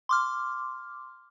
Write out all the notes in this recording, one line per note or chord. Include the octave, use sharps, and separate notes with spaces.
C6 D6 F6